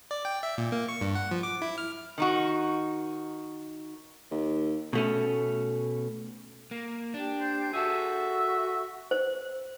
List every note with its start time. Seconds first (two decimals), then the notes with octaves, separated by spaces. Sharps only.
0.11 D5
0.25 G5
0.43 E5
0.58 A#2
0.72 A#3
0.89 C#6
1.01 G2
1.15 F#5
1.31 F3
1.43 D6
1.62 E4
1.78 F6
2.18 D#3 D#4 F#4
4.31 D#2
4.93 B2 A3 C#4
6.71 A#3
7.14 D4 G4
7.40 C5
7.74 F#4 G#4 A4 E5
9.11 C5